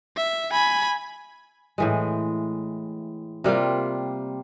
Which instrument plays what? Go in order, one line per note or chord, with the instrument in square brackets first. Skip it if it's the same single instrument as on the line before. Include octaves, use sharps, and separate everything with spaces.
[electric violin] E5
G#5 B5
[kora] A2 E3 G#3
C3 G3 A#3 F4